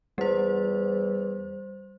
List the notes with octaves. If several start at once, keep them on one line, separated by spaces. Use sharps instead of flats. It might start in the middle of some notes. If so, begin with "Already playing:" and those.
E2 G3 C5